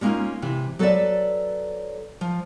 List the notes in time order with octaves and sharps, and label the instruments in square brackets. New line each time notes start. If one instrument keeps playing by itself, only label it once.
[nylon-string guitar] G3 G#3 A#3 C#4 D#4 F4
C3 E3
F#3 A4 B4 C#5 D5 E5
F3